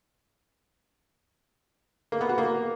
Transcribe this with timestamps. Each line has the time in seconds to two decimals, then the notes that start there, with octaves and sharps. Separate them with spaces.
2.12 A#3
2.21 B3
2.29 F#4
2.38 A#3